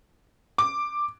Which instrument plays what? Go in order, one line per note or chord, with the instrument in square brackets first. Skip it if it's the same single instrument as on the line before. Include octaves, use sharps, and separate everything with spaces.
[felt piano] D6